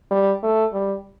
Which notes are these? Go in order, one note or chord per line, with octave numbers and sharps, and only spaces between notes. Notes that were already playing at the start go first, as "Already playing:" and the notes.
G3
A3
G3